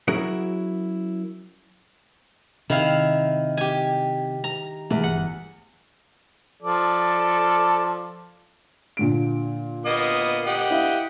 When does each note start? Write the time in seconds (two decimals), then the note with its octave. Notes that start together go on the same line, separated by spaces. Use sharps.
0.08 F#3 C#4 E4 F#4 G#4 A#4
2.70 C3 D#3 E4 F5
3.57 G4 G#5
4.44 A#5
4.90 E2 B2 G#3 A3
5.03 G1 F#5
6.63 F3 A4 D5
8.97 A#2 D3 D7
9.86 A#3 B3 D#5
10.47 G4 D#5 F#5
10.70 E4 F5